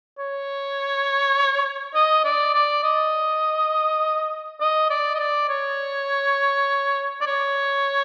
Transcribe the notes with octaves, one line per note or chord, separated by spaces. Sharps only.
C#5
D#5
D5
D5
D#5
D#5
D5
D#5
D5
C#5
D5
C#5